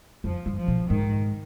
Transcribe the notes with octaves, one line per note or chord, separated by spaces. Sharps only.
F2 F3
G2
F3
B2
G#2 D#3